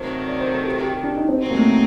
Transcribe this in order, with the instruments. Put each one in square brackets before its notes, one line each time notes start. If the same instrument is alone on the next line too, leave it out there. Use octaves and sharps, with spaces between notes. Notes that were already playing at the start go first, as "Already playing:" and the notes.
Already playing: [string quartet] C3 D#3 F#3 A3 [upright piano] C5
[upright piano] D5
C5
A4
G4
G4
G4
D4
D#4
D4
C4
[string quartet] C3 F#3 C4 D#4
[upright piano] A#3
A3